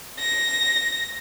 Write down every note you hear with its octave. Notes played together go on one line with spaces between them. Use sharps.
A#6